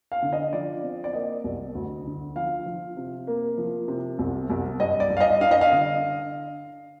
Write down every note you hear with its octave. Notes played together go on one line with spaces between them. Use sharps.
F5
D3
D#5
F3 D5
C4
D5
A#3 D#5
C2
D2
D3
F3 F5
F3
C3
A#3
F3
C3
C2
C2
G2 D#5
D5
G2
F5
D#5
D4 F5
D#5
F5
D3